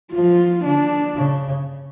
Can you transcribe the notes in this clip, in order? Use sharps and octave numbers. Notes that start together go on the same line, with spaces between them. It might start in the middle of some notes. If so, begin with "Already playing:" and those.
F3 F4
D3 D4
C#3